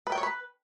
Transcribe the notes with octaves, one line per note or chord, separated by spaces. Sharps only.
B4
G5
C#5
B4